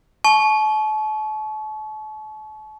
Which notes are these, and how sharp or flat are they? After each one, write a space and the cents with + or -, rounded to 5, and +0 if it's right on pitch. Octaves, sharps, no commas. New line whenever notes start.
A5 -40 C#6 +0